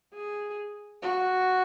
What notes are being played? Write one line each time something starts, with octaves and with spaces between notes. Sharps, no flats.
G#4
F#4